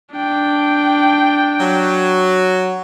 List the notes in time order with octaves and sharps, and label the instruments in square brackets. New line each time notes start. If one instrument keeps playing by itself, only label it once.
[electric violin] D4 G5
[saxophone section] F#3